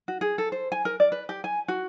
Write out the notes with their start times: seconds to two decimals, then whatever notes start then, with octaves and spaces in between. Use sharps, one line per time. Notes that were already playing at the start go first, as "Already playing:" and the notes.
0.08 F#4
0.21 G#4
0.38 A4
0.52 C5
0.72 G#5
0.85 A#4
1.00 D5
1.12 B4
1.29 G4
1.44 G#5
1.68 F#4